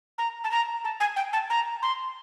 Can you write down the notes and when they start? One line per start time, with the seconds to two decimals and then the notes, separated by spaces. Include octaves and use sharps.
0.18 A#5
0.44 A5
0.51 A#5
0.84 A5
1.00 G#5
1.16 G5
1.33 A5
1.50 A#5
1.82 C6